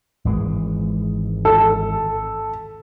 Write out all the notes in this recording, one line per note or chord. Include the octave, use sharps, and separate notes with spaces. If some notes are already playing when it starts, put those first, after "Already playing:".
G#1 E3 G#3
A4